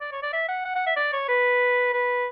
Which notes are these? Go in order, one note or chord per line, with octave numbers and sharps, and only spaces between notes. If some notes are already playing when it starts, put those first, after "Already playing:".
D5
C#5
D5
E5
F#5
F#5
F#5
E5
D5
C#5
B4
B4